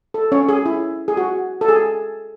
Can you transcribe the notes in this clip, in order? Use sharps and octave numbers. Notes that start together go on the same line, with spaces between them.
A4
C#4 C#5
G#4
E4
G#4
F#4
A4
G#4